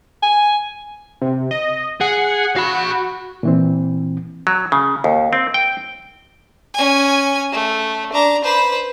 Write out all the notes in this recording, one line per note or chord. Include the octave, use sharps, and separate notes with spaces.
G#5
C3
D#5
G#4 F#5
F#4 F5 B5
A#2 E3 C4
F#3
C#3
D#2
C4
G5
C#4 G#5
A3
D4 A#5
B4 C5